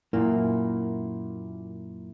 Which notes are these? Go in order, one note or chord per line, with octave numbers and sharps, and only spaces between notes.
F#2 A#2 A#3 E4